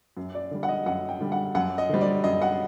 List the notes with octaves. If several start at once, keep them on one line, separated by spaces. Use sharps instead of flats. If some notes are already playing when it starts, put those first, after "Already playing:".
F#2
D5
D3 G3
F#5
D#5
F#2 F#5
G5
D3 G3
F#5
F#2 F#5
D#5
D3 G3 C5
D5
F#2 D#5
F#5